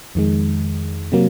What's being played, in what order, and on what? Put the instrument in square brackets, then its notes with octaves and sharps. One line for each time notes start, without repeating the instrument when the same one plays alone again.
[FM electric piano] F2 D#3 G#3
C3 F#3 A#3